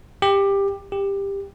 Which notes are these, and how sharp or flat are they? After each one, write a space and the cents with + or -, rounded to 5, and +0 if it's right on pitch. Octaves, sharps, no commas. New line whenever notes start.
G4 +15
G4 +15